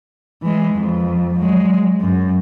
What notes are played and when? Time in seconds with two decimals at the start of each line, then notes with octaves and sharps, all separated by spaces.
0.42 E3 G#3
0.75 F2
1.40 F#3 G#3
2.00 F#2